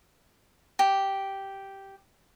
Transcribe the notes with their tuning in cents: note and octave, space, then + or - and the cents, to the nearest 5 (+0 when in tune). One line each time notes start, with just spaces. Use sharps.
G4 -5